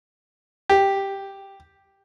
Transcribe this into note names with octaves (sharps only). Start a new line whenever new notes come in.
G4